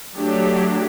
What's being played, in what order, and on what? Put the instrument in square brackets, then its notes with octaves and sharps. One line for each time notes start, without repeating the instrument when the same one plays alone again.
[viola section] F#3 A3 D4 G4